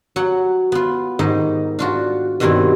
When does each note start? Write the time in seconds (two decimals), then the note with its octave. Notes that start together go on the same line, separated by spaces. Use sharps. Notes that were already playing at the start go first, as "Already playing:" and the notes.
0.16 F#3 F#5
0.72 B3 F4
1.19 G#2 D#3 D#4
1.79 D4 F4 F#4
2.40 G2 B2 D#3 C4 E4